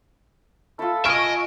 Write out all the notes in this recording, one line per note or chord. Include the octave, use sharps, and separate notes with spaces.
E4 F4 A4
D#5 E5 G#5 C#6 F6 D7